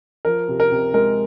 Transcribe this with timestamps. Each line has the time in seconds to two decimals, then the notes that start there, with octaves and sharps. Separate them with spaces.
0.25 F3 A#4
0.48 C3
0.60 A#4
0.72 C3
0.94 G#3 A#4